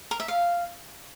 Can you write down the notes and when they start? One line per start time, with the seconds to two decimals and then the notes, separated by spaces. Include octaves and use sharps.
0.11 A#4
0.20 E5
0.28 F5